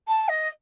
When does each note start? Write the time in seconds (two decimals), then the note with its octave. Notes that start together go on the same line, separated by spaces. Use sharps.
0.08 A5
0.29 D#5